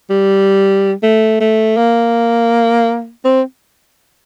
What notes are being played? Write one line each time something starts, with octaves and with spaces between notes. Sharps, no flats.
G3
A3
A3
A#3
C4